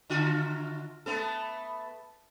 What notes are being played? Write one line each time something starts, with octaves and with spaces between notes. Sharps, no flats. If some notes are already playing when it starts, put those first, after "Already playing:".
D3 F4 F#4
A3 B3 A4